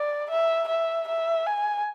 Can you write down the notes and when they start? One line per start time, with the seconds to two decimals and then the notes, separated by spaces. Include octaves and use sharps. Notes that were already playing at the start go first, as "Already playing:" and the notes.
Already playing: D5
0.30 E5
0.68 E5
1.08 E5
1.46 G#5